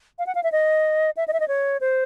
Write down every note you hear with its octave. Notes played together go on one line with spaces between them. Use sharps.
F5
F#5
F5
E5
D#5
E5
D#5
E5
D#5
C#5
C5